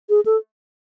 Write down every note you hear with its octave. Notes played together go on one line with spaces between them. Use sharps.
G#4
A4